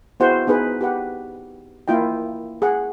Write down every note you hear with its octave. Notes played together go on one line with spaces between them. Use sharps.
B3 E4 F#4 G#4 C5 F#5
B3 D#4 G#4 B4
G4 B4 F#5
A#3 E4 F4 D#5 G5
G#4 F#5